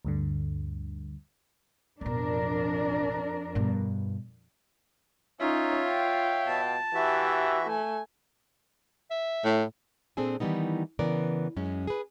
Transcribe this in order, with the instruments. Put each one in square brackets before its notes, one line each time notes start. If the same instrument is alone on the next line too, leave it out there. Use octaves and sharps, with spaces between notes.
[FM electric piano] D2 G2 D3
[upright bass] A1 B2 [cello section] F2 D4 A#4
[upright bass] G2 B2
[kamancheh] C#4 D#4 [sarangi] F4 [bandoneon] C#5 E5
[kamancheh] F5 G5
[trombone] B2 [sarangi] A5
[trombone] E3 [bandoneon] F#4 E5 [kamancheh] G4
[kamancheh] A3 G#5
[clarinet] E5
[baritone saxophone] A2
[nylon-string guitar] A#2 C4 D4 G#4 A4 G#5
D#3 E3 G3 B3 D#4
C#3 E3 B3 A#4 D5
F#2 G#3 C#4
G#4 B4